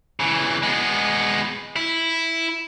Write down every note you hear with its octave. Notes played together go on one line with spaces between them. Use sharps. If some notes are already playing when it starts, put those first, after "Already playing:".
C#3 E3
G#3 B3
E4